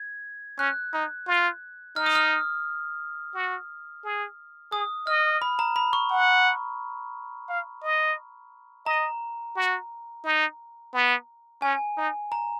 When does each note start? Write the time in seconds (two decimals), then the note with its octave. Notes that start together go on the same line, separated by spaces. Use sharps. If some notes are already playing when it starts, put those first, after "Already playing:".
Already playing: G#6
0.59 C#4 F#6
0.94 D#4
1.27 F4
1.96 D#4 F6
2.06 D#6
2.15 F6
3.35 F#4
4.04 G#4
4.72 G#4 D#6
5.07 D#5 F6
5.42 B5
5.59 A#5
5.76 B5
5.93 C#6
6.10 F#5
7.49 F5
7.83 D#5
8.86 D#5 A#5
9.56 F#4
10.24 D#4
10.94 B3
11.62 C#4 G#5
11.97 D#4
12.32 A#5